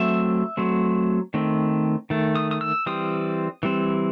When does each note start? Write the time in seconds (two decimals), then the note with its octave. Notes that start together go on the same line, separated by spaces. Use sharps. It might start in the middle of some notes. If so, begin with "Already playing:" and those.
Already playing: F#3 A3 C4 E5
0.57 F#3 A3 C4
1.34 D#3 A3 C4
2.10 D#3 A3
2.35 D#6
2.51 D#6
2.61 E6
2.86 E3 G3 C4 D#6
3.63 E3 G3 C4